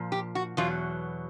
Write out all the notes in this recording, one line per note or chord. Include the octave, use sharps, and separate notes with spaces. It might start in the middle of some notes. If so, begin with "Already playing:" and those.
Already playing: A#2 F3
G4
F#4
E2 B2 F#3 F4